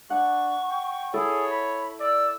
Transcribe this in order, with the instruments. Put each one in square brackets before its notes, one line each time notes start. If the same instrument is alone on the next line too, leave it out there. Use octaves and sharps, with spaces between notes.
[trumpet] D4 [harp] F#5 [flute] C#6
[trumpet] G5
[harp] E4 A4 [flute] G#4 [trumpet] C#5
[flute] B5
[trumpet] D5 [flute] E6